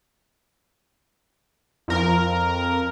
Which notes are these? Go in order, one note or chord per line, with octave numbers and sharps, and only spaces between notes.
F2 A#4